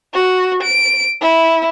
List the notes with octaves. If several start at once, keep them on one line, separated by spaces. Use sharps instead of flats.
F#4
D7
E4